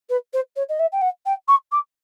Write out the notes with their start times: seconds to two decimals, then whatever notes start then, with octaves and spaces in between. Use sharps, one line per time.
0.09 B4
0.33 C5
0.56 C#5
0.69 D#5
0.79 E5
0.92 G5
1.01 F#5
1.25 G5
1.48 C#6
1.71 D6